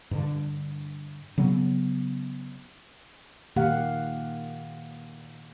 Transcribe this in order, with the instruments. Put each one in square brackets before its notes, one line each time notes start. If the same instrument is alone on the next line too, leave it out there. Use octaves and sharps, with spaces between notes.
[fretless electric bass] G2 D3
C#3 F#3 B3
[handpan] A#2 D#3 A#3 G4 F5 F#5